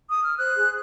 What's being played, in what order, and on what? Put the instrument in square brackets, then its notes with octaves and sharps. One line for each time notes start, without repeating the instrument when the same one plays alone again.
[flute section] D#6
F6
C5 F#6
G#4